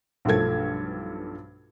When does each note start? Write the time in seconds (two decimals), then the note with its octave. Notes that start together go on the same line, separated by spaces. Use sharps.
0.25 B1 G2 F3 A3 A4 G#6